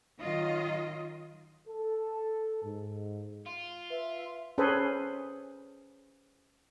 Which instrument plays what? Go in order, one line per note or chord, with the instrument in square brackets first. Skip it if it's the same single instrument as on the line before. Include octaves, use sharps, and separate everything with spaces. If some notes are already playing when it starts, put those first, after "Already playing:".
[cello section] D#3 F#3 F4 D#5
[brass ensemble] A4
G#2
[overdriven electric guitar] F4
[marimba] B4 [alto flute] E5
[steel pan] C#4 G#4 A4 B4 C5